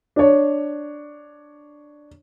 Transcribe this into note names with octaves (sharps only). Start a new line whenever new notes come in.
D4 C#5